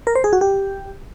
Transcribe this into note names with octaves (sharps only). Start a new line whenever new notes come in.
A#4
C5
G#4
F#4
G4